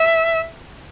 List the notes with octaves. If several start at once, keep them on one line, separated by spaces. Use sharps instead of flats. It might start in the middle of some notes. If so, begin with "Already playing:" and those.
Already playing: E5